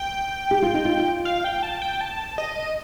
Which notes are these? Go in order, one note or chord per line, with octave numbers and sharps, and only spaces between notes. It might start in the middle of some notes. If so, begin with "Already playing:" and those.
Already playing: G5
G4
F4
D#4
F4
F5
G5
A5
G5
A5
D#5